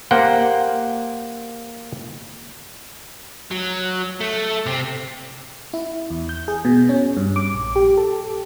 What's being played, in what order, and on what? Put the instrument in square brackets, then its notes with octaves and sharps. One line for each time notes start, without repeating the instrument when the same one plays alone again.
[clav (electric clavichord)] A#3 G4 C5 F#5 G5
[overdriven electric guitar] F#3
A3
C3 C4
[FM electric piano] E4
E2
G6
G#4
B2
C#4
G2
D6
A#1
G4
A4